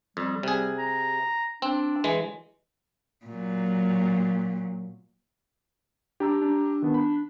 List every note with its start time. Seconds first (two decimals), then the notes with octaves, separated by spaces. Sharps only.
0.17 F2 G3
0.43 C3 G#4
0.78 A#5
1.62 C4 D4
2.04 E3 G#3
3.26 A#2 F#3
6.20 D4 G4 A#5 E6
6.41 D4
6.82 D#3 B3
6.94 B5